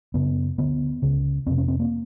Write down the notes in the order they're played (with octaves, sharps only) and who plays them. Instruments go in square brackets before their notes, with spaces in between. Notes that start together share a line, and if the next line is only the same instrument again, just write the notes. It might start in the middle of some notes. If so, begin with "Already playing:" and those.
[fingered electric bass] F#2 C#3 B3
D2 D3 B3
C#2 C#3
F2 C3 C4
C#4
C4
A#3